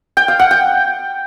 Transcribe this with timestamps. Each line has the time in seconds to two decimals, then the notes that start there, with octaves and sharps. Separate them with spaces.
0.17 G5
0.28 F5
0.39 F#5
0.51 G5